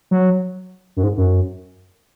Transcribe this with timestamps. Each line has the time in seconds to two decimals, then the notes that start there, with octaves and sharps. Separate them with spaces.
0.11 F#3
0.97 F#2
1.03 G#2
1.17 F#2